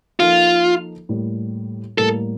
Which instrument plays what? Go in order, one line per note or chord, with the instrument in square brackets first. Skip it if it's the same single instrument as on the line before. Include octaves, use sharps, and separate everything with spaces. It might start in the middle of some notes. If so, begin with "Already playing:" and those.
[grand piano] F3 A#3 D#4 A4 [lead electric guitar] F4
[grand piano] A2 G3 A#3
[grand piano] A2 G3 A#3 [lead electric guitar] A4